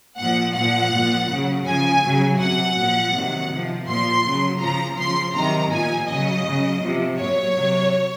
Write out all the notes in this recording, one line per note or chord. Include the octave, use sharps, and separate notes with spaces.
A#2 F3 F#5
A#2 F3 F#5
A#2 F3
C#3 F#3
C#3 F3 G#5
C#3 F#3
C3 F#3 F#5
A#2 F3
C3 D#3 F#3
C3 F3
A#2 F3 C6
C#3 F#3
C#3 F3 A#5
C#3 F3 C6
C3 D#3 F#3 A#5
A#2 F3 G#5
C#3 F#3 D#5
C#3 F#3
C3 F3
A#2 F#3 C#5
C3 F#3